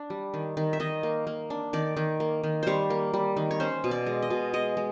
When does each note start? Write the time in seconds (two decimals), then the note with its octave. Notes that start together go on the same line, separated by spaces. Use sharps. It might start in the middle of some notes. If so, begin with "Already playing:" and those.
Already playing: D4
0.10 G3
0.34 D#3
0.57 D#3
0.73 E5
0.80 D#3 D#5
1.03 A#3
1.27 A#3
1.50 D4
1.73 D#3 D5
1.97 D#3
2.20 A#3
2.44 D#3
2.63 G3 C5 C#5
2.90 A#3
3.14 G3
3.37 D#3
3.51 C#5
3.60 C#4 C5
3.84 B2
3.91 D5
4.07 G#3
4.22 D#5
4.30 B2
4.54 G#3 D#5
4.77 G#3